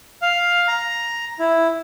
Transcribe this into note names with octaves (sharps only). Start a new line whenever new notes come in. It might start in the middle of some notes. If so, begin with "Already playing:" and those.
F5
A#5
E4